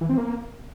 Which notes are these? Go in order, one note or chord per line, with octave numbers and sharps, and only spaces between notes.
E3
C4
A#3